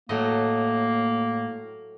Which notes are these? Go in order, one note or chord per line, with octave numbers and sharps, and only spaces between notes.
A2 F#3 A3 A#3 D#5